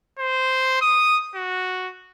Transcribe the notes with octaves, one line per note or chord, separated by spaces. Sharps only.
C5
D#6
F#4